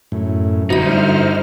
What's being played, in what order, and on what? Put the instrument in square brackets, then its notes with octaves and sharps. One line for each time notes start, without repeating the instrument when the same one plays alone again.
[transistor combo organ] F#2 A2
[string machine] G2 C5 F6 [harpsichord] B2 B5 [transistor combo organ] D3 [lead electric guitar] D#4 E4